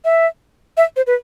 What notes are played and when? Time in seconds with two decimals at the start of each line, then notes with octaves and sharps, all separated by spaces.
0.05 E5
0.77 E5
0.96 C5
1.07 B4